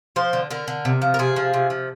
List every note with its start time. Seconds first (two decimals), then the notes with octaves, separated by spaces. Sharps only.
0.16 F3 C5
0.33 D3
0.50 D3 A#4
0.68 D3
0.85 C3
1.02 F3
1.14 A#4
1.19 C3 G#4
1.36 F3
1.54 C3
1.70 F3